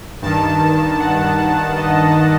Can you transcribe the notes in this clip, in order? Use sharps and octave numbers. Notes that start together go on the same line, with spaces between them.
G2 D#3 A5
F#5
D#5